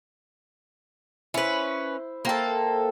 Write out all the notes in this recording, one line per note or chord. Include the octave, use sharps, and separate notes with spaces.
C#4 E4 B4 C5
A#3 A4 C5 G5 A5